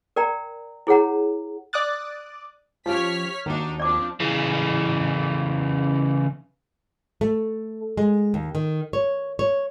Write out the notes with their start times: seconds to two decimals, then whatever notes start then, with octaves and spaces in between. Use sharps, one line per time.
0.16 A#4 D5 G5 A#5
0.87 E4 G#4 C#5 F#5 A#5
1.73 D5 D6 D#6 F#6 A6
2.86 F3 C#4 F4 G4 C#5 F6 B6
3.46 D#2 A#3 D4 D#4 F#4
3.80 F3 C4 D4 D5 D6
4.21 C#3 E3
7.21 A3
7.97 G#3
8.34 D#2
8.55 D#3
8.93 C#5
9.39 C#5